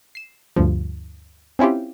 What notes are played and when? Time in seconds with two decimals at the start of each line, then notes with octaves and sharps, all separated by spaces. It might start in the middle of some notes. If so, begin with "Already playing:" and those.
0.15 C7 E7
0.56 D2 G2 F3
1.59 C4 C#4 E4 F4 G4